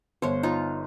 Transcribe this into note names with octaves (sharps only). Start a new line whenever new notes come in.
G1 C5 C#5
D#4 F4